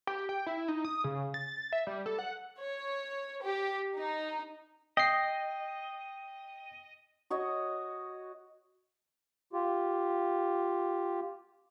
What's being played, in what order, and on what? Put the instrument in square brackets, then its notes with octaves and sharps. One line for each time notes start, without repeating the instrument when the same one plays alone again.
[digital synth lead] G4
G5
E4
D#4
D#6
C#3
A6
E5
G3
A4
F#5
[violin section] C#5
G4
D#4
[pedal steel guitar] D#5 [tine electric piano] G5 C7
[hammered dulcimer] F#4 C#5 D#5
[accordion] F4 G4